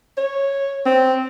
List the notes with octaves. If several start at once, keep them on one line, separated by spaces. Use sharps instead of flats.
C#5
C4